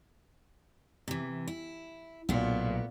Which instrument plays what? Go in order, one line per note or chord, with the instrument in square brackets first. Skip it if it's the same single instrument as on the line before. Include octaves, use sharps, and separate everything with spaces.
[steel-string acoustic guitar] C3 E3
E4
[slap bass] B1 [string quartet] A#2 [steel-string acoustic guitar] A3 B3